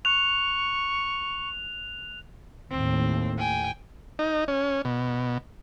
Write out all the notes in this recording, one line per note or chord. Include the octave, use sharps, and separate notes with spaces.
C#6 F#6 F7
D#2 A2 C4
G5 G#5
D#4
C#4
B2